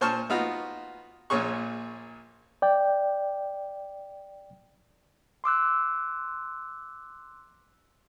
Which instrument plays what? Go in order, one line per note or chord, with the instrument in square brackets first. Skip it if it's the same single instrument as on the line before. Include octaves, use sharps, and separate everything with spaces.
[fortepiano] A#2 C5 A5 C#6 F6
B3 D#4 F4 F#4
A#1 A#2 C#4 G#4 C#6
[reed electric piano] D5 G5
[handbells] C6 D6 E6 F#6